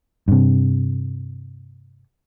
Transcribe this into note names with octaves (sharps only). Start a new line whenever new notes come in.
G2 C3